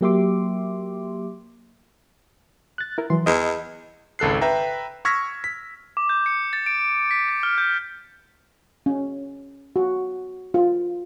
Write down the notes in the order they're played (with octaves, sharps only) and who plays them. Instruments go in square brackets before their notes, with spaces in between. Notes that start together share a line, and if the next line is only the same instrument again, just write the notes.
[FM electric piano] F#3 A#3 G4 E5 C6 D6
[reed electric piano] F#6 A6
E4 A#4
E3 F#3 C6
[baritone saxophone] E2 [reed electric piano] D#5
[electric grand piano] G#1 C#2 A4 F#6 C7
B4 E5 G5 A#5
C#6 E6 F6 G#6 A#6 B6
B6
[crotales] D6
G6
C#7
A6
D7
B6
A6
F6
G6
[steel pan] C#4
F#4
F4